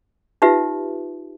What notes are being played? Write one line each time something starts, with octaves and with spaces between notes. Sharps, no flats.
D#4 F4 G4 B4 E5